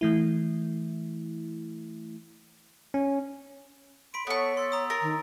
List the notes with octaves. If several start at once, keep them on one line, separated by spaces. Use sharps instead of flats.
E3 A3 E4
C#4
B5 C6 B6 D7
B3 A4 C#5 C#6
C6 E6 A6
A#5 D#6
A#4 A6
D#3